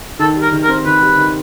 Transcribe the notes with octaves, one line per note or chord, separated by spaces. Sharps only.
D#3 A4
G3
A#4
D#3
A#4
C4
D#3 B4
G3
D#3